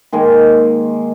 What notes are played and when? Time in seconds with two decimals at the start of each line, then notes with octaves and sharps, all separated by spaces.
0.12 D#3 G#3 A#3 G#5